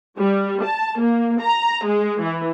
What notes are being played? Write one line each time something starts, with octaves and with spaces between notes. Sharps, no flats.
G3
A5
A#3
A#5
G#3
E3